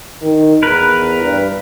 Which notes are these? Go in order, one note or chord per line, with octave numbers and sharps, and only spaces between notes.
D#3
E2 A#4 B4
G2